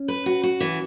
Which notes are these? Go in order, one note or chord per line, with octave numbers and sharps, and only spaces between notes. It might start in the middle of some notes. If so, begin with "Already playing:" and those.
Already playing: C#4
B4
F#4
F#4
E3